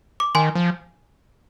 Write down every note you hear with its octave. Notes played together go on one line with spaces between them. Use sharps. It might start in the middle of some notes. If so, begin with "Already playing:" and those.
D6
D#3 G#5 C6
F3